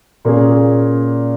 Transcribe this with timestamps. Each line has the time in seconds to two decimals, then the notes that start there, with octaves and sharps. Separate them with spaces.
0.25 A#2 A#3 C#4 G#4